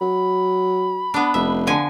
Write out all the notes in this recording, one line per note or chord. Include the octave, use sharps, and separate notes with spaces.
F#3 B5
B3 D4
F1 E5
D3 F3 G#5